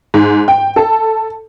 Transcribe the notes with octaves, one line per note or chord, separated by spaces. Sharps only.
G#2
G5
A4